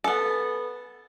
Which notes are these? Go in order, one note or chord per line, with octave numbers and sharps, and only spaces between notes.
B3 A4